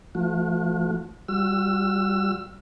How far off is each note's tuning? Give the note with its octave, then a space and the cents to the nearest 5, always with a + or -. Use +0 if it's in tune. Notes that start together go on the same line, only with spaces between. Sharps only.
F3 -45 A3 +0 F#4 -45
G3 +0 F#4 -35 E6 +25